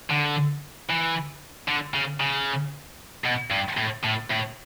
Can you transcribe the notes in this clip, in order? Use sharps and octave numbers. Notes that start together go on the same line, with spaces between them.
D3
E3
D3
C#3
C#3
B2
G2
A2
A2
A2